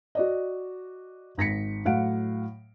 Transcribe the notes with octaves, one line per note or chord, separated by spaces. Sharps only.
F#4 D5 D#5
G#1 A#6 B6 C#7
A2 F#3 F5 F#5 D7